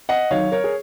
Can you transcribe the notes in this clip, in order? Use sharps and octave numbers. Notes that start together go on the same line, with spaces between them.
D#5 F#5
D#3 F#3 C#5 F5
A#4 C#5
G#4